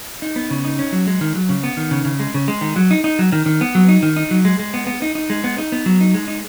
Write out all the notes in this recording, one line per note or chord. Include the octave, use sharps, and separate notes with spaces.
D#4
B3
C#3
D#4
C#4
F#3
G#3
D#3
F#3
C#3
B3
D#3
C#3
C#3
G#3
C#3
G#3
D#3
F#3
D#4
D#4
F#3
D#3
D#3
B3
F#3
D#4
D#3
D#4
F#3
G#3
G#3
B3
B3
D#4
D#4
G#3
B3
D#4
B3
F#3
D#4
G#3
D#4